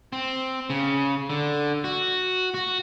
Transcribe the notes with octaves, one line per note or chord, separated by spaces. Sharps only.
C4
C#3
D3
F#4
F#4